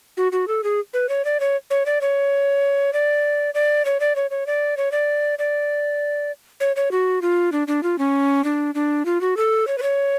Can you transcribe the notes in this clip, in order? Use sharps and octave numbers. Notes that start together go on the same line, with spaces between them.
F#4
F#4
A4
G#4
B4
C#5
D5
C#5
C#5
D5
C#5
D5
D5
C#5
D5
C#5
C#5
D5
C#5
D5
D5
C#5
C#5
F#4
F4
D4
D4
F4
C#4
D4
D4
F4
F#4
A4
C#5
B4
C#5